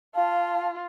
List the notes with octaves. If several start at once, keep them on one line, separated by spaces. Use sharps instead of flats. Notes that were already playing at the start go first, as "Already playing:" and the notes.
F4 F5 A5